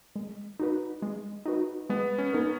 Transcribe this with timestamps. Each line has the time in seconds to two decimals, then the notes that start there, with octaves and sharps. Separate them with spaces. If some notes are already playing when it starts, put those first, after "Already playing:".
0.16 G#3
0.60 D#4 F#4 B4
1.02 G#3
1.46 D#4 F#4 B4
1.90 G#3 B3
2.18 C#4
2.33 B3 D#4 A#4